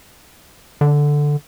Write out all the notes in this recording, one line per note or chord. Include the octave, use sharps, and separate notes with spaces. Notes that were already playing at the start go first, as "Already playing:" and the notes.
D3